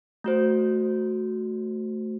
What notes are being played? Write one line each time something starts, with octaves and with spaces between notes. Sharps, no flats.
A3 F#4 C5